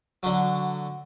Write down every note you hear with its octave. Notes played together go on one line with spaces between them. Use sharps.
D3 F#3